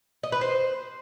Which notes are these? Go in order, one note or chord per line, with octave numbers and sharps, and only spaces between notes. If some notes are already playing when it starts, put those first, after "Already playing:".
D#5
B4
C5